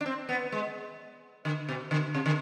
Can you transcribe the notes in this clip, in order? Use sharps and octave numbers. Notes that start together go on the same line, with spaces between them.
D4
C4
B3
G#3
D3
B2
D3
C3
D3